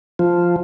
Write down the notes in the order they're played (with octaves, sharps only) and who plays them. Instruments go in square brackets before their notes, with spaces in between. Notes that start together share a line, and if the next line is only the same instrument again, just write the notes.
[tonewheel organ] F3